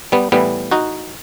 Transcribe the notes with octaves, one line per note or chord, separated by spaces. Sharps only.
G3 B3
A2 E3 G3 B3
D#4 F#4